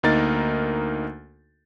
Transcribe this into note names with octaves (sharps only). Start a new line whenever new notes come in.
D2 A#3 D#4 A#4 A6